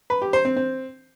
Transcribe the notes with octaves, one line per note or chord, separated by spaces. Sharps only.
B4
G4
C5
C4
C4